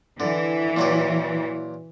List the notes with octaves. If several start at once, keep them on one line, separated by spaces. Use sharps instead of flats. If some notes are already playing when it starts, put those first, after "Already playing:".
D3 E3
A#2 F#3 G4